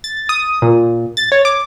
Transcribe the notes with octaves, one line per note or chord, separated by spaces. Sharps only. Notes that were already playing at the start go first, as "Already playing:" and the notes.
A6
D#6
A#2
A6
C#5
D6